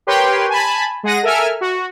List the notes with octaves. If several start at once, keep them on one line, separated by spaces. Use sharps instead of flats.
G4 A#4 B4 C#5 G5 C6
G#5 A5 B5
G#3 G#4 F#5 A#6 D#7
A4 A#4 E5 G#5 F6
F#4